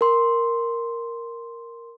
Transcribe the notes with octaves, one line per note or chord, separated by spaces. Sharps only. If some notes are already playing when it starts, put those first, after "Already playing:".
A#4 C6